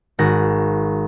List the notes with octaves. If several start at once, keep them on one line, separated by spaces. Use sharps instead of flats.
G#1 F#4 A#6